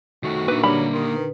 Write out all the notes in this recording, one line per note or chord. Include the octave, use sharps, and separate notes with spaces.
D#3 A3 F#4
A#2 A#3 D4 D#4 B4 E5
D3 F#3 G3 D4 G4 B5
D#3 C6 D#6
B4